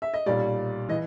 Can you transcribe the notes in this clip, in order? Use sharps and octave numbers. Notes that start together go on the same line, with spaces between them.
E5
D#5
B1 A#2 G3 D5
E3 D#5